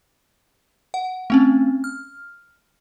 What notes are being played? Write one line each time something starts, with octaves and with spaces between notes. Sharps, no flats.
F#5
A3 C4 C#4
F6